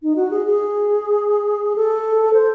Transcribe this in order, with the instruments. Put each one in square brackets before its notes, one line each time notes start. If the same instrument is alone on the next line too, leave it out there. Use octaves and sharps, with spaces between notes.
[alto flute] D#4
F#4
G#4
G#4
A4
C5